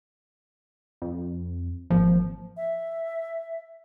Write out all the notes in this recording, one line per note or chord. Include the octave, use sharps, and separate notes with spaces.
F2
G#1 F3 A#3
E5